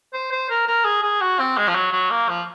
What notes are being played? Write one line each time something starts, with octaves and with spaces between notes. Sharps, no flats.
C5
C5
A#4
A#4
G#4
G#4
F#4
C4
G#3
F3
F#3
F#3
A#3
F3